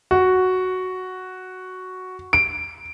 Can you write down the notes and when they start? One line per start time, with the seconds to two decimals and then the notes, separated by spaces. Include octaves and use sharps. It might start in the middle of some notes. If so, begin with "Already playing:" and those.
0.11 F#4
2.33 D7